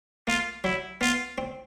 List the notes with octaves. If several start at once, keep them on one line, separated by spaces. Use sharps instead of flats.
A#3 F4
F#3 E4
B3 F4
C4